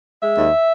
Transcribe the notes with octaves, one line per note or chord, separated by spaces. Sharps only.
G#3 E5
D#2